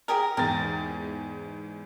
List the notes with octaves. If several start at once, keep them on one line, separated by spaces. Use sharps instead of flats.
G4 G#4 A#4
E2 G#2 G4 A#4 A6